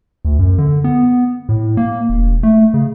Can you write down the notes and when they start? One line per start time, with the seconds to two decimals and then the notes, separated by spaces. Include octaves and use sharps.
0.25 D2
0.39 F#2
0.58 D3
0.84 B3
1.49 A2
1.77 A#3
2.09 E1
2.43 A3
2.74 C#3